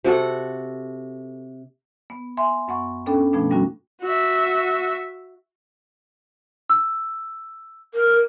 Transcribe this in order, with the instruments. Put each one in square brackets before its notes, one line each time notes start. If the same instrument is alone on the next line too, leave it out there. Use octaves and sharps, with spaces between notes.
[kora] C3 F#4 A4 F#5
[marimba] B3
E5 G#5 C6
F#2 B3 F#5 C#6
B3 C#4 D4 A4 G5
B2 F3 A3 B3 D4
F#2 G3 C#4 D#4 F#4
[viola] F#4 E5
[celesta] E6
[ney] A#4